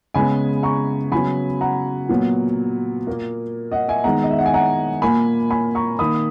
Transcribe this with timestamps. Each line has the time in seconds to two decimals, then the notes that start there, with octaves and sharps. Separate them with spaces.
0.14 C#3 G#3 B3 G#5 B5
0.63 A#5 C#6
1.12 C#3 F#3 B3 G#5 B5
1.61 F#5 A#5
2.09 A#2 F#3 B3
3.07 A#2 A#3
3.71 D#5 F#5
3.89 E5 G#5
4.04 D#3 G#3 B3 F#5 A#5
4.23 D#5
4.31 E5
4.39 F#5
4.46 G#5
4.54 F#5 A#5
5.02 A#2 A#3 G#5 B5
5.50 G#5 B5
5.75 A#5 C#6
5.99 D#3 A#3 B5 D#6